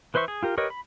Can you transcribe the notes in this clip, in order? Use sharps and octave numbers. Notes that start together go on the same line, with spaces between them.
E3 B4 C5 E5 C#6
G#4
F4 G4 A#4
G4 A#4 B4 C#5 D#5
B5